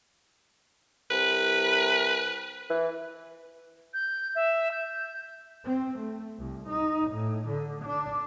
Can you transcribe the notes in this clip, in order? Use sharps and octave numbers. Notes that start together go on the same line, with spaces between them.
C2 B4
E3
G6
E5
G6
C4
A3
C2
D#4
A2
D3
D4